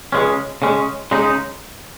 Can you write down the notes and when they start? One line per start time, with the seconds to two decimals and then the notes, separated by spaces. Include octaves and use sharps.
0.12 C#2 C#3 G#3 C#4
0.62 C#3 G#3 C#4
1.11 C#3 G#3 D#4